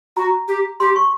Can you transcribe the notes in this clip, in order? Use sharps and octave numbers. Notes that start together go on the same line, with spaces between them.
F#4 A#5
G4
G4 C6
C#6